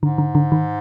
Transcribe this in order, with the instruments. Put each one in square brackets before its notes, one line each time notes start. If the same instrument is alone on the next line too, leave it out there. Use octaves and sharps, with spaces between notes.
[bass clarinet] G#2 [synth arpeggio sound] D3
[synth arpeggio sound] D3
D3
D#3